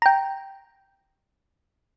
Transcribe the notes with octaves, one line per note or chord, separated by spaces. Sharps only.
G5 A#5